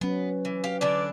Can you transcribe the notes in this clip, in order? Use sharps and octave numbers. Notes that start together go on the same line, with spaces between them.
F#3 B3 C#4 B4
E3
G4 F5
D3 E3 D4 D5